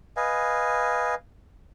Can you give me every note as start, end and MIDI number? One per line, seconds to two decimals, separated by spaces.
0.17 1.15 71
0.17 1.15 75
0.17 1.15 77
0.17 1.15 80